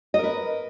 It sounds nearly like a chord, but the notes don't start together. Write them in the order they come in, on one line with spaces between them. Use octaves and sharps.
D#5 A#4 B4